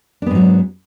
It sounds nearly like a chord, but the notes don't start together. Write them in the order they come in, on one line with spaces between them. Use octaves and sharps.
D4 B3 G#2 F#3